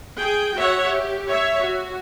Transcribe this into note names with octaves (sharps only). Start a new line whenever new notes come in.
G#4 G5
F#4 C#5 E5 F#5
G4
C#5 E5
F#4